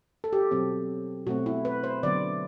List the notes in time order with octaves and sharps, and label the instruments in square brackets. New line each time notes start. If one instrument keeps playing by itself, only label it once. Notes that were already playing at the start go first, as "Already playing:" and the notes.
[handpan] A4
G4
B2 F#3 C4
B2 A3 C4 F#4
E4
B4
C5
D3 F#3 B3 D5